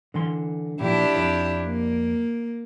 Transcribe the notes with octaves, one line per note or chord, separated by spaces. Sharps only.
D3 E3 C6
A#2 D#3 F3 D4 E4 G4
F2 D5 B5
A#3